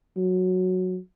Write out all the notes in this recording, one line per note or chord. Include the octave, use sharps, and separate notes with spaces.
F#3